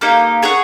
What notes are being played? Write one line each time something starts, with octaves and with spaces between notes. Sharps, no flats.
A#3 D#4 G4
G#4 C#5 F#5